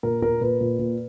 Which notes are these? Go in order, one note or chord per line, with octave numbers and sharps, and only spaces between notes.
A#2 A#4
A#2 A#4
A#2 B4
A#2
A#2